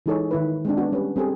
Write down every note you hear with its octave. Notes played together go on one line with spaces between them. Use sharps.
E3 G#3 D#4 G#4 A4 C#5
D#3 E4 B4
G#3 C4 D4
B3 D4 F#4
G3 C#4 D4 B4
G3 C4 G#4 A4